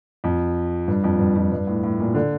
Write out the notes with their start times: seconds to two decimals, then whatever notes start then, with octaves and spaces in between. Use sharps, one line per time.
0.24 F2
0.88 G2
1.04 F2
1.19 G2
1.36 F2
1.52 G2
1.67 A2
1.83 A2
1.99 A#2
2.14 D3